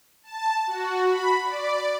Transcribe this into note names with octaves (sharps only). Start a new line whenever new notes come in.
A5
F#4
B5
D5